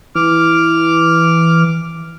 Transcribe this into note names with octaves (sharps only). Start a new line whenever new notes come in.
E3 D6 F6